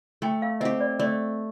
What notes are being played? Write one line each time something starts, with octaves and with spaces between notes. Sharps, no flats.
A3 G5
F5
C4 G4 D#5
D5
A3 D5